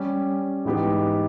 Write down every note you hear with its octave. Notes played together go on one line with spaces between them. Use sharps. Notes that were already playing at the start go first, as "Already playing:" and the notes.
Already playing: G3 C#4 G4
G#2 E3 G#3 B3 G4